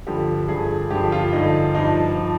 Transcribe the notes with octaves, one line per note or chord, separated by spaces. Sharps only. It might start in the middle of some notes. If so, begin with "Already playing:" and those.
G2 D3 F3 G4
G2 D3 F3 G#4
G2 D3 F3 G4
F4
G2 D3 F3 D#4
G2 F3 D#4
F3